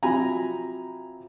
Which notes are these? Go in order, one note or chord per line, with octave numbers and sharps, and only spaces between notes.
C3 F3 F#3 G#5 A#5 B5